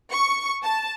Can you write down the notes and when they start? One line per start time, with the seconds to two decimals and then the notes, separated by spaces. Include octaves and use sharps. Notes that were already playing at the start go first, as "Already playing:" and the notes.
0.12 C#6
0.62 A5